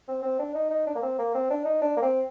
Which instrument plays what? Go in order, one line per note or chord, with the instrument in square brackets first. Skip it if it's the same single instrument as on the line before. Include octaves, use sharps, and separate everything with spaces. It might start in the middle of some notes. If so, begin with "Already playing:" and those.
[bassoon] C4
C4
D4
D#4
D#4
D4
A#3
C4
A#3
C4
D4
D#4
D4
A#3
C4